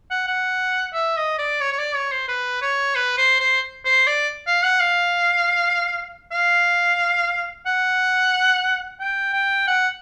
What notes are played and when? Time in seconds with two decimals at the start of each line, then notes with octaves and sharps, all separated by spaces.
0.11 F#5
0.27 F#5
0.94 E5
1.17 D#5
1.39 D5
1.61 C#5
1.72 C#5
1.79 D5
1.95 C#5
2.12 C5
2.28 B4
2.62 C#5
2.95 B4
3.18 C5
3.40 C5
3.85 C5
4.07 D5
4.47 F5
4.63 F#5
4.80 F5
6.32 F5
7.66 F#5
9.00 G5
9.33 G5
9.67 F#5